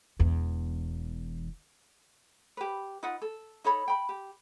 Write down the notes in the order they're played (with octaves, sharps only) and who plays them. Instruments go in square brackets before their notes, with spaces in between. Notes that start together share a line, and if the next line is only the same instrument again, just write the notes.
[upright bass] E1 E2
[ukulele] G4 B4
D#4 F4 B4 F#5
A4
D#4 A4 C#5 B5
G5 B5
G4